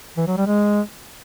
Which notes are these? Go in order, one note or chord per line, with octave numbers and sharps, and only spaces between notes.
E3
F#3
G3
G#3